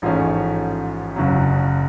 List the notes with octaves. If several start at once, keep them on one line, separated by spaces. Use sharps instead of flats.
A1 G#2 F3 A3 C#4
F#1 F#2 C#3 F#3